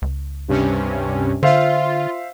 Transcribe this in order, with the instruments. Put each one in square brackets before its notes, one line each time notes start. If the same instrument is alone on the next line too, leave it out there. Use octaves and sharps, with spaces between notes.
[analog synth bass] C#2
[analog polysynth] G2 C3 C#4
[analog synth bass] D3 [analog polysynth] F4 [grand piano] C5 E5 F5